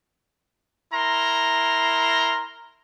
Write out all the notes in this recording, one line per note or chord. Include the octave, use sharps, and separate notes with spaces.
E4 A#4 A#5 C6